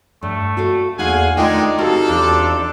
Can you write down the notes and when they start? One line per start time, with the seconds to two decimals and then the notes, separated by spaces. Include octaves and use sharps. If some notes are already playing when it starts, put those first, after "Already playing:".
0.23 G2 A3
0.57 F#4 A4 F5
0.99 E2 A#3 D#4 G#4 F5 F#5 G#5
1.37 D3 D#3 G#3 A3 D#4 F4 D5 G5
1.79 C3 F4 F#4 A4 F5
2.08 E2 D4